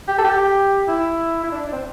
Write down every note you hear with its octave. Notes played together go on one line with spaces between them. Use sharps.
G4
A4
G4
E4
E4
D4
D4
C4